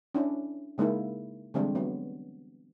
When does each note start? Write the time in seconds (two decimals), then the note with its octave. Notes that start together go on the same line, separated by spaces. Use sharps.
0.15 C#4 D4 E4
0.78 C#3 G#3 A#3 D#4 E4
1.54 D3 E3 G3 G#3 C4 D4
1.75 F#3 B3